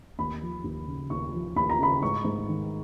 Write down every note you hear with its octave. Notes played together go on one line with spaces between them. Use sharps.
D#2 B5
F3
D#2
C#3
D#2 C#6
F3
D#2 B5
A#5
C#3 B5
G#2 C#6
G#2
D#3